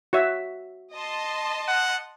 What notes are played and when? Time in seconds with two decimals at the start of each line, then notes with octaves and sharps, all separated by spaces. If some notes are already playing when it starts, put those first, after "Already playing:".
0.13 F#4 C#5 E5
0.93 D#5 A5 C6
1.68 F#5